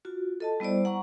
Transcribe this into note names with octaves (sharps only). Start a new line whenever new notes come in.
F4 F#4
A4 D#5 A5
G3 B3 E4 C5 D5
F#5 A#5 C#6